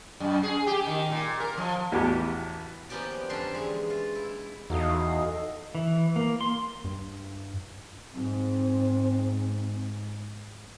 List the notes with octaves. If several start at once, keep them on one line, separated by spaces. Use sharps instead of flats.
F#2
G#4
G4
D#3
A#2
A#4
F3
A1 E2 B3 F#4 G4 B4
F3 A#3 B3 C#4 G4 D5
F2 D3 C#4 D4 A5 C6
E3 G#3
F4
E4
E2 D#4 F#4 A4 D#5 F5 D#6
A4 D#5
E3
A#3
C6
G2
G#2 C4